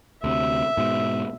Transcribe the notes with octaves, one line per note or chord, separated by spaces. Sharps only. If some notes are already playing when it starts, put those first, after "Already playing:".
D2 C3 E5
G#2 B2